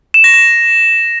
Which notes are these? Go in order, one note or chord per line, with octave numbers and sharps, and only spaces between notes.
E7
A#6
E7